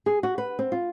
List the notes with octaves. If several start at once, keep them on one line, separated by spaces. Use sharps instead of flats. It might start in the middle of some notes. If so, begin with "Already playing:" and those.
G#4
F#4
B4
C4
F4